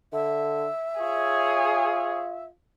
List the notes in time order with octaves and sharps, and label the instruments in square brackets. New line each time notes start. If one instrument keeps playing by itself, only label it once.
[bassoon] D3 [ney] E5
[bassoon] F4 [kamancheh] G#4 C#5